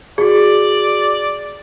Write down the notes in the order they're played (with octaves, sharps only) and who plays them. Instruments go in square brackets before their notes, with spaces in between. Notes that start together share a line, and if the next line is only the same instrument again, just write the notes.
[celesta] F#4 G#4 [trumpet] D5